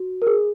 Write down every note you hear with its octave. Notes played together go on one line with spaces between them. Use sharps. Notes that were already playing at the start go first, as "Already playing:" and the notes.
Already playing: F#4
A#4
G#4